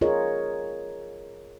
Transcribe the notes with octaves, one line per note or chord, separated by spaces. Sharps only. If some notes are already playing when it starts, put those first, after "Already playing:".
F4 G#4 A#4 C#5 D#5